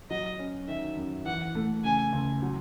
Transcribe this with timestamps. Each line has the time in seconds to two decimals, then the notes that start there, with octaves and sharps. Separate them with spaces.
0.10 F#3 D#5
0.39 C#4
0.68 D#3 E5
0.96 F#2
1.26 E3 F#5
1.55 A3
1.83 C#3 G#5
2.13 C#2
2.42 F#3